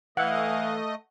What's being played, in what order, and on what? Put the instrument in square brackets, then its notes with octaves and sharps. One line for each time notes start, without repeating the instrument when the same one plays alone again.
[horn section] E3 [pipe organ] A3 D#5 [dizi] F5 [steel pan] F#5